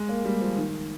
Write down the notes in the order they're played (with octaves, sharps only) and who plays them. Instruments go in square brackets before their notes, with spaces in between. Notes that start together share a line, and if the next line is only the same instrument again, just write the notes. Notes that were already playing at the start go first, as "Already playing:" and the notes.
Already playing: [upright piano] G#3
A#3
G3
F3
D#3